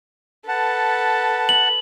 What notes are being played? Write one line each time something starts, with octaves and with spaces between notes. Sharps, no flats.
A4 B4 F#5 A5
F#7